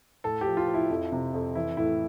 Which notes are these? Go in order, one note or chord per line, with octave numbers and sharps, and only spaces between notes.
A2 A4
G4
F3
F4
F3
E4
F2
C3
F2
E3 E4
A2 E4